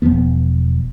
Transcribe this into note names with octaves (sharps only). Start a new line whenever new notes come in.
E1 D#2 F3 B3